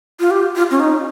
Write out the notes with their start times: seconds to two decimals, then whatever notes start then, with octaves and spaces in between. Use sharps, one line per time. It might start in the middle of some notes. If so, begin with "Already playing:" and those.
0.20 F4
0.31 G4
0.55 F4
0.71 C#4
0.80 D#4